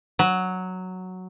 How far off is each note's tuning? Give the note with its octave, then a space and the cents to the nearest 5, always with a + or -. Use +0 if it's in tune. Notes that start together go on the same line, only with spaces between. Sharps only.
F#3 +0